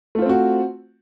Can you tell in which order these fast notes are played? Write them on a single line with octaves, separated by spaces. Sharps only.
A3 F4 C5 C4 F#4